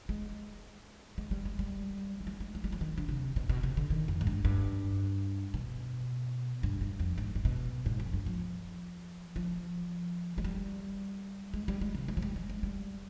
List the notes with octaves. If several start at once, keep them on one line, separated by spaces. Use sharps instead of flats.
G#3
G#3
G3
G#3
G3
G#3
G3
G#3
G#3
G3
F3
D#3
D3
C3
B2
B2
C3
D3
D#3
F2
G#2
G2
G2
B2
G2
G2
F2
G#2
G#2
B2
G#2
F2
G2
F3
F3
G#3
G3
G#3
G3
G#3
C3
G#3
F3
G3
G#3
G#3
G3